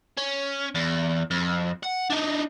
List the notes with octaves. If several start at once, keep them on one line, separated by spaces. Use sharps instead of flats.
C#4
E2
F2
F#5
D4 D#4